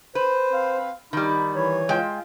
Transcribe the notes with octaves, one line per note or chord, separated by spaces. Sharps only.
B4 C5
C4 F5
D#3 G3 D#4 B5
E3 C#5
G#3 F4 G5